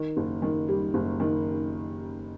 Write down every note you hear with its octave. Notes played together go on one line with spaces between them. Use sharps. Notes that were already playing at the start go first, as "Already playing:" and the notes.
Already playing: D#3
F#1
D#3
G3
F#1
D#3